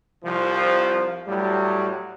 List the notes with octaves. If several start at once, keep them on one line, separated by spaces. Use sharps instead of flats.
C2 C3 F3
A2 F#3 G3